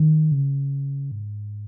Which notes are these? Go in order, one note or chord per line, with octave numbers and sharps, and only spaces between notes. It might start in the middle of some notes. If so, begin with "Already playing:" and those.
Already playing: D#3
C#3
G#2